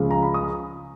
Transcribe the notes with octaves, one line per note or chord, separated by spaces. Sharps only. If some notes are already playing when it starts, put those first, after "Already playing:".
Already playing: C#2 C#3 F3 G#3
A#5
B5
D#6